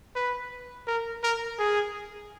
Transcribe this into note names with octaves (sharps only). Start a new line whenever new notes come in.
B4
A#4
A#4
G#4